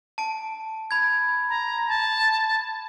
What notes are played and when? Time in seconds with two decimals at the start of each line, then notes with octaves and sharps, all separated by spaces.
0.18 A5 D7
0.91 B5 G#6
1.49 A#5
1.88 A5